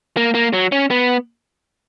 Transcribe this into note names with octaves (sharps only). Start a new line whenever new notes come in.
A#3
A#3
F#3
C#4
B3